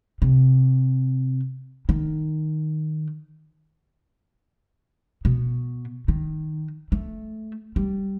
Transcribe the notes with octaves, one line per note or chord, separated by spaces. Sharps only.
C3
D#3
B2
D#3
A3
G3